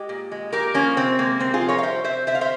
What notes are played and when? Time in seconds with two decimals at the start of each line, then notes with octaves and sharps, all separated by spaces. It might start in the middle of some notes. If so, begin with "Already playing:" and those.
Already playing: G#3 G4
0.09 A#2
0.32 G#3
0.52 A#2 G4 A#4
0.74 F3 A#3 C#4
0.97 C3 C4
1.19 G#3 A#3
1.39 C3 C4
1.54 F4 G#4
1.61 F3
1.69 A#4 C#5
1.79 F5
1.83 G3 C5 E5
2.04 C3 C5 E5
2.27 C3 C5 E5
2.35 F5
2.41 C5 E5